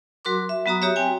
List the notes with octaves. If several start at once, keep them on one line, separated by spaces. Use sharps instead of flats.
F#3 F#4 A#4 C6 D6
E5
F#3 B3 F#4 A#5 D#6
F#4 G4 C#5 E5
C4 G5 G#5